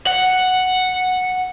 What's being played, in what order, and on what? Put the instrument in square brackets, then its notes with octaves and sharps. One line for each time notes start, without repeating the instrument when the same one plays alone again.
[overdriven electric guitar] F#5